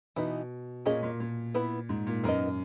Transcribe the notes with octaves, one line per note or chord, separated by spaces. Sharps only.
B2 E3 B3 D#4
A#2 A#3 C#4 G#4 D#5
A#2
A#2
B3 E4 B4
G#2
A#2
F#2 B3 D#4 A#4 D#5